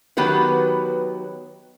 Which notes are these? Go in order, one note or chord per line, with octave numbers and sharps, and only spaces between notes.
D#3 F#3 B3 F#4 G4 B4